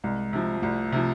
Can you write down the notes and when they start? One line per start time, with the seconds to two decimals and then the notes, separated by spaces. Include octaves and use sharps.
0.04 C2 G#3
0.33 C3 F3
0.62 C2 A3
0.92 C3 F3